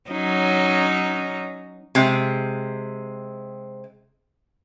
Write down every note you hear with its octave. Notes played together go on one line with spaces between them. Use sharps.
F#3 C#4 D#4
C3 G#3